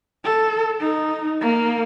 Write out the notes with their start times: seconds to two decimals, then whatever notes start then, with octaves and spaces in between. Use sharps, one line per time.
0.24 A4
0.80 D#4
1.41 A#3